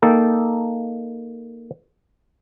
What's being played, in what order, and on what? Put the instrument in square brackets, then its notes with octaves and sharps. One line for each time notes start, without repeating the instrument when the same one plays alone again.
[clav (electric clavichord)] A#3 D#4 A4 G5